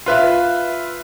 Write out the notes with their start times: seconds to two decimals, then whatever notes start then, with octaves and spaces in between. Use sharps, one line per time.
0.06 F4 B4 E5